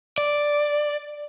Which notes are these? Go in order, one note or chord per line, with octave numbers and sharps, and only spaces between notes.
D5